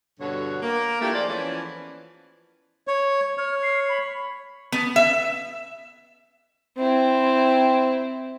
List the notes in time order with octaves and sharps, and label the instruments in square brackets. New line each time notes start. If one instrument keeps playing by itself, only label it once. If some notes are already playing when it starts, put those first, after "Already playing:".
[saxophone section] G2 B2 D3 F#4 C#5
A#3
A3 A#3 D4 E4 F4 G4
F3 G#3 A4 C5 D5
E3 F3 B3 C#4
[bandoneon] C#5
[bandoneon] C#5 [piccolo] F6
[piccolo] C7
B5
[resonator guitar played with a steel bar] B3
E5
[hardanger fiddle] C4 E4